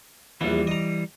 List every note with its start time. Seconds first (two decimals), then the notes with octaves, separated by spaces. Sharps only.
0.41 A#1 E2 E3 G3 B3
0.67 D#5 A#5